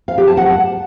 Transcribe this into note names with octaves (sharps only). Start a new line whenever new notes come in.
F5
G4
A5
F#5